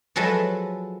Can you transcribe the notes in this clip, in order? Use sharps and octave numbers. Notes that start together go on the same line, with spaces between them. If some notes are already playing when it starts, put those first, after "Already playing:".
F3 F#3 G#3 A4 B4 E5